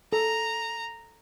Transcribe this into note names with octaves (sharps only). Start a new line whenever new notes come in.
A4 A#5